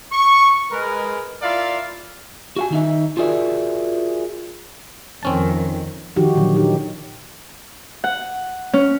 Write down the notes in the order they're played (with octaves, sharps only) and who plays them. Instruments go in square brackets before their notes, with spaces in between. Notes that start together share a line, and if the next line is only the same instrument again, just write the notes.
[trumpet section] C#6
G#3 A#4 B4
E4 F4 A#4 D5 E5 F5
[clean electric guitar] F#4 F5 G#5
D#3 D#4 E5
F4 F#4 G#4 A#4 D5 E5
[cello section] F2 D#3 [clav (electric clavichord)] C4 C#4 A5
[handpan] D#3 F3 D#4 F#4 G4
A#2 D3 D#3 F3 F#3
D#4 G4
[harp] F#5
C#4